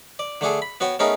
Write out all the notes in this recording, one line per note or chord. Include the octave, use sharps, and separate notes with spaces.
D5
D3 A3 D4 G#4 A4
B5
B3 F#4 C#5 G5
A3 B3 C#4 D#4 G#4 A#4